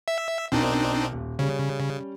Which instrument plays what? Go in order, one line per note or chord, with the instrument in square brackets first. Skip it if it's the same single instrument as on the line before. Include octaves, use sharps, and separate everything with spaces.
[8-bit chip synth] E5
[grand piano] B1 A#4 [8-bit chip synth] C4 D4 D#4
[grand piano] D#1
[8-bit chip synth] C#3 [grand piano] G3 C#4